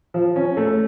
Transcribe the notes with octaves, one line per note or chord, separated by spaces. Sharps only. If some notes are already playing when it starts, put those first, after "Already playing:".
F3
C#4
A3